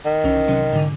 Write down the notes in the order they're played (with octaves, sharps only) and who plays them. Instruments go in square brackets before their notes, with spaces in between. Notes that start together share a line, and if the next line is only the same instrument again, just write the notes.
[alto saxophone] D#3
[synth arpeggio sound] C2 E3 C#4
C3 F#3 C#4
G#2 D3